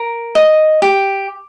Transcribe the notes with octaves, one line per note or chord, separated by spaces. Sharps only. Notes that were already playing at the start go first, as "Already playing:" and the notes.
Already playing: A#4
D#5
G4